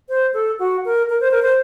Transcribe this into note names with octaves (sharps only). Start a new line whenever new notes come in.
C5
A4
F#4
A#4
A#4
C5
A#4
C5